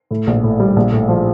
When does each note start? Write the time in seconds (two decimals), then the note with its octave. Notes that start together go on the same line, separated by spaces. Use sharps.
0.11 A2
0.27 A#1
0.44 A2
0.60 G3
0.76 A#1
0.92 A2
1.08 F3